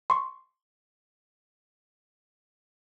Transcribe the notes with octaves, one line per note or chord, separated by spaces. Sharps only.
C6 C#6